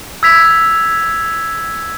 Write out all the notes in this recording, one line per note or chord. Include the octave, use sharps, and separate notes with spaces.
E6 G#6 B6 F7